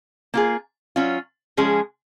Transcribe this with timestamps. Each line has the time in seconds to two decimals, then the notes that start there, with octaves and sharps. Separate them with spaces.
0.34 A#3 F4 G#4
0.96 F#3 C#4 F4
1.57 F3 G#3 C#4 G#4